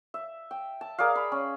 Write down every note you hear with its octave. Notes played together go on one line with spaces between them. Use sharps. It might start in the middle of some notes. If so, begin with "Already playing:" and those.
E5
G5
A5
G#4 A#4 D5 F5
B5
C#4